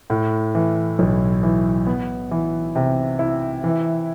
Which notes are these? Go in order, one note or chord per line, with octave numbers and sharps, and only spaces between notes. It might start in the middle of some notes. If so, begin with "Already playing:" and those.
A2
E3
B1
E3
B3
E3
C3
E4
E3